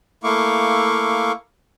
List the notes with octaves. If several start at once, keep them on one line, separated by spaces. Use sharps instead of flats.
A3 A#3 E4 F5 C#6 D6